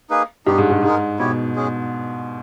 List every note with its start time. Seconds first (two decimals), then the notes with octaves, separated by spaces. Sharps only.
0.10 A#3 D#4 G#4 B4
0.46 G2 B3 D#4 G4
0.58 G#2
0.70 G2
0.83 G#2 G#3 D#4 A#4
1.19 B2 B3 E4 G4 C#5
1.56 G#3 C#4 G#4